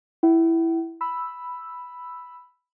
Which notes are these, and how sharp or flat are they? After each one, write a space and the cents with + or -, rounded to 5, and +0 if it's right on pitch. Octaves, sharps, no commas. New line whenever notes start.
E4 +0 F#5 +45
B5 +0 E6 +0